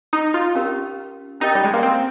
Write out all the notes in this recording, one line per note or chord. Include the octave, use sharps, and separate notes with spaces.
D#4
F4
C#4 G4 A#4 F5
C#4 D#4 G4 A#4 D#5 G5
G3
G#3
A#3
C4